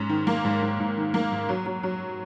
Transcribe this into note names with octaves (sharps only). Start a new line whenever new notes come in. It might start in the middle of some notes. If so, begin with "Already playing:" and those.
Already playing: G#2 C#4
D#3
A#3
G#2
G#2
G#2
D#3
A#3
G#2
F#3
F#3
F#3